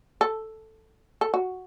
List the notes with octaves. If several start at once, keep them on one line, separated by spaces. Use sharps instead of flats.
A4
A4
F#4